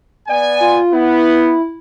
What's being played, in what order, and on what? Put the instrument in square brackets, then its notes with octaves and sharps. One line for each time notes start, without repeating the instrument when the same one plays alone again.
[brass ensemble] B3 D5 G#5
[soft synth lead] F4
[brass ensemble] B3 [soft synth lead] E4